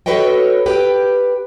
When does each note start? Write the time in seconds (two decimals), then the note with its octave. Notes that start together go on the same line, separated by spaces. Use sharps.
0.06 F#4 A4 B4 C#5 D#5 G5
0.66 G4 B4 G5